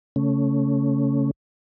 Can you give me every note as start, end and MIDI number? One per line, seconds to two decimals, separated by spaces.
0.16 1.31 49
0.16 1.31 57
0.16 1.31 61